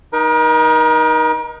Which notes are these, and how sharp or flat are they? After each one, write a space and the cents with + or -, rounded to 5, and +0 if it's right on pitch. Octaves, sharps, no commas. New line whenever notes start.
D#4 +0 A#4 +40